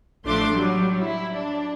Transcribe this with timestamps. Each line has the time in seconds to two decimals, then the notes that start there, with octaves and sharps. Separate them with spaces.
0.25 A1 F3 A3 D4 C6 D6
0.54 F#3 G3
1.01 E4
1.33 D4